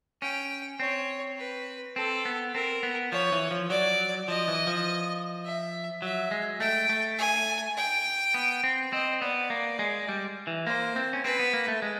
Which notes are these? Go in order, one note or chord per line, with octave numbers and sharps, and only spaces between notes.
C#4 G5
C4 C#5
B4
C4 A4
B3
C4 A#4
B3
F3 C#5
E3
F3
F#3 D5
F3 D#5
E3
F3
E5
F#3 E5
G#3
A3 G5
A3
G#5
G5
B3
C4
C4 D#5
B3 D5
A#3
G#3
G3
E3
A#3 C5
C4
C#4
C4 B4
B3
A#3
A3
G#3